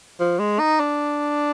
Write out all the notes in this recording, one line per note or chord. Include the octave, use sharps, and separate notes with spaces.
F3
G#3
D#4
D4